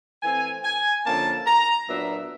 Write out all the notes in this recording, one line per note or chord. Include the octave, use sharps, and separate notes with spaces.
E3 A3 C4 G#5
G#5
D3 F3 A#3 C#4 E4 A5
A#5
A#2 F#3 B3 D4 E5